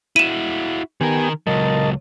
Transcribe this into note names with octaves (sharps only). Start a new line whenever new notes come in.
E4 F#4 D#7 E7
D#3 B3 G4 A#4 G#5
C#2 F#3 A#4 D#5 A5